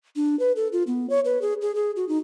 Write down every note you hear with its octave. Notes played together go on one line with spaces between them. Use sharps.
D4
B4
A4
F4
B3
C#5
B4
G#4
G#4
G#4
F#4
D#4